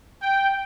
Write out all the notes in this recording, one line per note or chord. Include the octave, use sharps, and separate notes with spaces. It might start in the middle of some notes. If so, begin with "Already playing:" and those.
G5